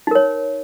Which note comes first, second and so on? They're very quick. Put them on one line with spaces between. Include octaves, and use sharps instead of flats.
D#4 A#4 C#5